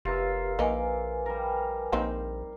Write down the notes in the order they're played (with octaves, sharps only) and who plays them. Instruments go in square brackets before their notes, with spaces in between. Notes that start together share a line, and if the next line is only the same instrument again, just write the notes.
[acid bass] F1 [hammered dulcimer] F4 A#4 E5 [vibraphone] G4 B4
[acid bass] A#1 [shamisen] A#3 D#4 [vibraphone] B4 G#5 [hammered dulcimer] D6
[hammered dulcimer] G3 A#4
[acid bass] A#1 [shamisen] A#3 C4 D#4